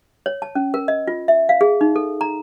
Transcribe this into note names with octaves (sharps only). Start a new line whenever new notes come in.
C#5
A5
C#4
A#4
D#5
F4
E5
F5
G#4
D#4
A4
A#5